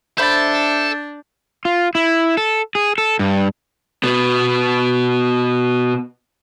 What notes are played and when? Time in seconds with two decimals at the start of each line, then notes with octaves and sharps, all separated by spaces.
0.18 D4 A4 C5 E5 B5 G6 A6
1.65 F4
1.95 E4
2.37 A4
2.75 G#4
2.98 A4
3.19 G2
4.04 B2 B3